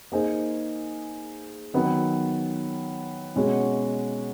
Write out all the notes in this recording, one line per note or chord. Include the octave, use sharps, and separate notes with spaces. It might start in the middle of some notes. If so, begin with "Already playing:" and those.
A#3 D#4 G#4 C5
D#3 F#3 B3
B2 G#3 C#4 F#4